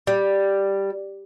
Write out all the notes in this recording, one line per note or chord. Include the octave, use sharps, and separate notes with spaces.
G3